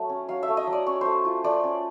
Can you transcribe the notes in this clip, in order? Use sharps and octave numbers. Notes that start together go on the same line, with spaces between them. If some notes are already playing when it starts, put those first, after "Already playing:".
Already playing: F#3 A3
C#4
F#3 F5
E5
A3
D#5
F#3
D5
C#4 C#5
A3 C5
F4
A3 D5
C#4